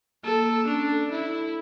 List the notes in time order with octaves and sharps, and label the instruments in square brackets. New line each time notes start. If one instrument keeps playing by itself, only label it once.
[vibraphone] A#3 [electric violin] A4
[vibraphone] A#3
[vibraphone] C#4 [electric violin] D4
[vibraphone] A4
[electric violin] E4